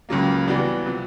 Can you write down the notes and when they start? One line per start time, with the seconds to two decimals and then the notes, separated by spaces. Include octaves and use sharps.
0.09 C#2 C#3 F#3 A#3
0.47 E3 G3 B3 D4 F#4
0.86 C3 F3